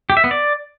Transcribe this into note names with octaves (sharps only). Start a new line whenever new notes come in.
G4
E5
B3
D5